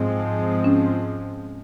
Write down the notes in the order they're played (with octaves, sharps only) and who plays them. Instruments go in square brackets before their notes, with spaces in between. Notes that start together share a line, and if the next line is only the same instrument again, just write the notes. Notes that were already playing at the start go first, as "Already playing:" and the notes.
Already playing: [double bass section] G#2 F3 G#3 C4
[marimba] C#4